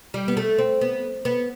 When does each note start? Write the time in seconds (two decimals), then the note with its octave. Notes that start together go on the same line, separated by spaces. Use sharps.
0.14 G3
0.28 B3
0.37 A3
0.58 C4
0.81 B3
1.25 B3